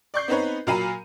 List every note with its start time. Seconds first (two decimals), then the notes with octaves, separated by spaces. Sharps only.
0.14 D5 C#6 G6 C7
0.28 B3 C4 D#4 B4 C#5
0.67 A#2 F#3 F5 A#5 B5 D#7